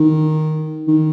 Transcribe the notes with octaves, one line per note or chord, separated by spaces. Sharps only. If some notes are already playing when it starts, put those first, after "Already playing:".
Already playing: D#3
D#3